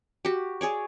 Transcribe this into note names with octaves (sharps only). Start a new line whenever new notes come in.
F#4 G4
G#4 C#5 D5